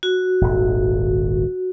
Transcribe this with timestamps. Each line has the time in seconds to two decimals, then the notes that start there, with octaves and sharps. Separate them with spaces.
0.03 F#4
0.41 D#1 G#1